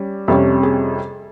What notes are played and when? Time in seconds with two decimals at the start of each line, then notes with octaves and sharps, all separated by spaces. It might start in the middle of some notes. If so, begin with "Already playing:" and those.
Already playing: G3 C#4
0.28 F2 C3 G3 C#4
0.63 G#4